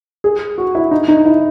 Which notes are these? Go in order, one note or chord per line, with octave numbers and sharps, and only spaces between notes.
G#4
F#4
E4
D#4
D#4
E4